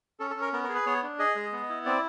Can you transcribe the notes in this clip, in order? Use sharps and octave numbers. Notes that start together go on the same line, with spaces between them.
C#4 A4
A4
C#4
A#4
B3 A#4
A#4
G#4
B4
B3 C#5
D4
G#4 D#5
G#3
B3
E4
C4 D5